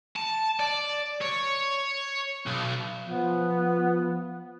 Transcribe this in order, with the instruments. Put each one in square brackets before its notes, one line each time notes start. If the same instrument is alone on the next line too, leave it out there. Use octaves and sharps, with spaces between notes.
[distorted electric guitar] A5
D5
C#5
B1
[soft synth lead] F3 [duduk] B3